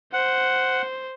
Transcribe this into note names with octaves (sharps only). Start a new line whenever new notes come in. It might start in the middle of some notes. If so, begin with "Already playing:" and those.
C5 F#5